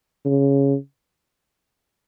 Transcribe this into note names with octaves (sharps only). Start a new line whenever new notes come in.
C#3